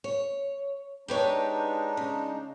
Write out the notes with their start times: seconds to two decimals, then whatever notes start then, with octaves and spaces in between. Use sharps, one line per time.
0.04 C#5
1.08 G#3 D4 D#4 G4 B4 C#5
1.97 C#3